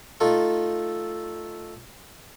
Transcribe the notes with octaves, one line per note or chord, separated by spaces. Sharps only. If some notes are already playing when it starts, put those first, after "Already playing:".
A3 D#4 F4 A4